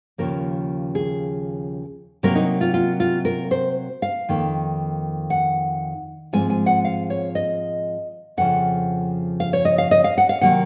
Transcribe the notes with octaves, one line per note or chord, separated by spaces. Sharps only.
D#2 C#3 F3 A#3 A#4
G#4
C3 F#3 A#3 A#4
D#4
F4
F4
F4
A#4
C5
F5
F2 D#3 A#3
F#5
G#2 F3 G#3 C4 G#5
G#5
F#5
F5
C#5
D#5
F2 C#3 F3 F#5
F5
C#5
D#5
F5
D#5
F5
F#5
F5
C3 D#3 F#3 A#3 F#5